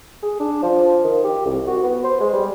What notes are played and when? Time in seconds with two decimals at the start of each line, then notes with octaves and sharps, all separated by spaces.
0.23 G#4
0.40 D4
0.63 F3
1.04 D#3
1.24 G4
1.45 C2
1.67 F#4
1.83 B3
2.04 C5
2.21 G#3
2.33 G3